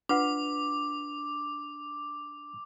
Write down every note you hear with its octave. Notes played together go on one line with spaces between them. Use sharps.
D4 F4 B4 F#5 D6